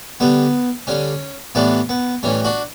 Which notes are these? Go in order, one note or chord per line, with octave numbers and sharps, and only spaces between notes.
D3 G3 B3
D3 G3 C#4
A2 E3 G3 B3 D4
B3
A2 E3 G3 C#4
D4 F#4